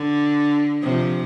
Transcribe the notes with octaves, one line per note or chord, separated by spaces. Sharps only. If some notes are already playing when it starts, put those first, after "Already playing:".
Already playing: D3
C3 F3